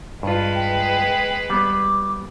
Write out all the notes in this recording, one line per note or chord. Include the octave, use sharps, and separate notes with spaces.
G2 G#3 F4 B4
G5
G3 B3 D6